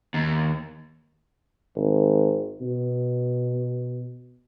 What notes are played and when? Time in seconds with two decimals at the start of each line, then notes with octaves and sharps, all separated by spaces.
0.14 D#2
1.76 G#1
2.61 B2